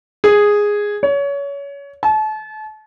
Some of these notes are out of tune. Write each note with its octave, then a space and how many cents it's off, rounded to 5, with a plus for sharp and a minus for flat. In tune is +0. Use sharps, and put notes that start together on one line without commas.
G#4 -5
C#5 +25
A5 -35